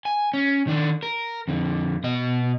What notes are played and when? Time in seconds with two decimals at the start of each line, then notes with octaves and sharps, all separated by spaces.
0.05 G#5
0.34 C#4
0.67 D#3 D4
1.03 A#4
1.48 F2 D3
2.04 B2 D#5